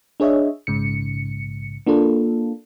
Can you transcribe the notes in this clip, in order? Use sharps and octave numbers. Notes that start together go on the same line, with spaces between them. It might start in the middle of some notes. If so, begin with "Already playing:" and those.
D4 G#4 C#5 D#5 E5
A#1 G#2 C#3 C#7
A#3 D4 F4 A4